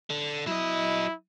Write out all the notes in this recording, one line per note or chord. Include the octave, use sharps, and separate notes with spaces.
D3
F#3 E4 D#5